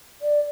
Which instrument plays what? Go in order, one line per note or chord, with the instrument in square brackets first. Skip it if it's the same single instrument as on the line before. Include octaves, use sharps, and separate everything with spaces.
[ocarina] D5